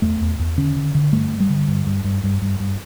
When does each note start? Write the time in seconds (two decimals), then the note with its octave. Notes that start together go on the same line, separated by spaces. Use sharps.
0.02 E2 A3
0.21 E2
0.39 E2
0.58 D3 C#4
0.76 D3
0.95 D3
1.12 G2 A3
1.31 G2
1.40 G3
1.50 D3
1.68 G2
1.86 G2
2.04 G2
2.24 G2
2.42 G2
2.60 G2